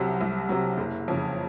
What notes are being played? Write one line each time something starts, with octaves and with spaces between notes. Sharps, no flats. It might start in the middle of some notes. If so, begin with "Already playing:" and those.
Already playing: C2 C3 F#3
C2
C3 F#3
F#1
F2 C#3